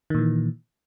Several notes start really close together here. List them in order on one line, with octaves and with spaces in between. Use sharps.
D#3 A#2 E3